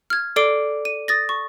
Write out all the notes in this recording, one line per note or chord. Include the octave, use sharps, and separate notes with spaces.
F6 G#6
A4 D5 D6 C7 D7 G7
D#7
D#6 A6 A#6
C#6